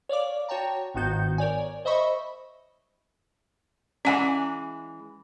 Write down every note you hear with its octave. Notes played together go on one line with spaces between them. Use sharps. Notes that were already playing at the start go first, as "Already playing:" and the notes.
C#5 D5 F5 D6
F#4 C#5 G5 A5 A#5
G1 G#2 D#3 B3 F#4 G6
A#4 C#5 D5 G#5
C5 D#5 E5 B5 C#6
E3 G#3 C#4 D5 F#5